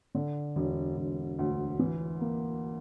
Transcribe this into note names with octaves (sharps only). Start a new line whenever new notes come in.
D3
E1
E1
D2
E3
A#3